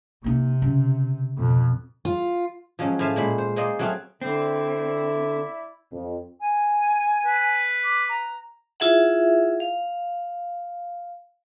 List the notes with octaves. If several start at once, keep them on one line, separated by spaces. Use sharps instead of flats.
C3 A#3 D#4
C#3
F2 B2
F4
F3 F#3 G#3 C#4
A2 C5 E5 F5 G#5 A5
A#2 G#3 C5 B5
C5
G#3 A#3 C5 D5 D#5
F#3 A3 C4 F#4 G#4 F5
D3 C4 E4 D5 E5
F2
G#5
B4
D6
A#5
E4 F4 G#4 E5 F#5
F5